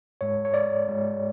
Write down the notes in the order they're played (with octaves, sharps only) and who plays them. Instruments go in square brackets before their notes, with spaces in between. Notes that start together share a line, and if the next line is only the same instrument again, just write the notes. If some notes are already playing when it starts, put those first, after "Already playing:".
[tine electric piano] G#2 G#3 C#5
C#5
D5
G#2 G#3